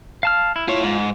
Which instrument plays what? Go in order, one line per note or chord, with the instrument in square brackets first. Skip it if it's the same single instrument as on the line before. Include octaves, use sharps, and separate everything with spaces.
[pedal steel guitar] F5 A5 F6
E4
[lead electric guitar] E4 C#5 [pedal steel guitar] F4
[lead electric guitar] G#2